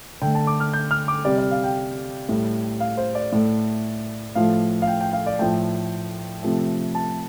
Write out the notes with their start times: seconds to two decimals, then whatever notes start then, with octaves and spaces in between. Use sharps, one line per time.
0.22 D3 A3 G5
0.35 A5
0.47 D6
0.60 F6
0.74 G6
0.91 F6
1.08 D6
1.25 C3 G3 D5
1.38 D5
1.51 F5
1.64 G5
2.29 A2 G3
2.80 F5
2.97 C5
3.15 D5
3.32 A2 A3
4.35 A2 F3 A3 F5
4.82 F5
4.87 G5
5.01 G5
5.13 F5
5.26 D5
5.39 A2 F3 A3 G5
6.43 C3 F3 A3
6.95 A5